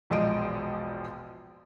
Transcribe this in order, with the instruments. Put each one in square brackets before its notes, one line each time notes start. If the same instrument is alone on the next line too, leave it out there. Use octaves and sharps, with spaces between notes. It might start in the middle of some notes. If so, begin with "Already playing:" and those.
[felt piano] E1 A#1 F3 G#3 D#5 D7